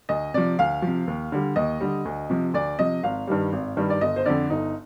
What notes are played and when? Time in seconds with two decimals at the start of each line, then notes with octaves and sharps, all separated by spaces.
0.09 D2 D#5
0.34 C3 F3 D5
0.59 D2 F5
0.82 F3
0.87 C3
1.07 D#2
1.32 D3 G3
1.56 D#2 D#5
1.80 D3 G3
2.05 D2
2.30 C3 F3
2.54 D2 D5
2.79 C3 F3 D#5
3.03 G#1 F5
3.27 G2 D#3 G3
3.52 G#1
3.77 G2 D#3 G3
3.90 D5
4.01 G1 D#5
4.16 C5
4.25 F2 D3 D5
4.50 G1 D#4